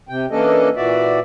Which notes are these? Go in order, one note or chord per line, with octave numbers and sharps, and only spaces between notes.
C3 G5
E3 A#3 C#4 D4 A4 D#5
A#2 E3 F#4 D5 E5